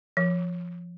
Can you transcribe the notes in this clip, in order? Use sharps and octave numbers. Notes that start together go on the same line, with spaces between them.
F3